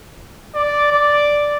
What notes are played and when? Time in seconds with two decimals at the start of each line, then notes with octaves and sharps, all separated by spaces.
0.55 D5
0.92 D5